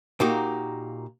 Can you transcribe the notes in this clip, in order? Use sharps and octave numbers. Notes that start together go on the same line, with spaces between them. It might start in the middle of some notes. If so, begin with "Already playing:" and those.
A#2 A#3 D#4 F#4 G4